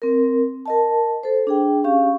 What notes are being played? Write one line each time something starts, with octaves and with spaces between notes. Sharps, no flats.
C4 A#4
A#4 D#5 A5
A4 C5
D4 G#4 G5
C#4 G4 F5 C#6